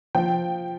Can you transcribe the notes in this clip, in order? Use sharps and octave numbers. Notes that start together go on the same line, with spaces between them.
F3 G5